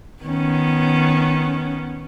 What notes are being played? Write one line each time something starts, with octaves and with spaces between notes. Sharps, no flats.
D#3 B3 C#4